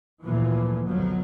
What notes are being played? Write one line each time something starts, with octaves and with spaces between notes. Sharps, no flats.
G#1 D2 A#2 E3 F3
G#1 D2 B2 F3 F#3